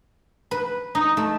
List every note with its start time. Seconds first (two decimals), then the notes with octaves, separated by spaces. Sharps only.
0.51 B4
0.95 D#4
1.17 A3